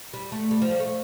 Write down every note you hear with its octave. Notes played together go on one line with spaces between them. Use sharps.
G3
A3
G3
F3
G3
A3